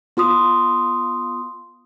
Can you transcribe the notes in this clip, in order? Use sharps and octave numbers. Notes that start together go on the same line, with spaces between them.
B3 F4 C6 D#6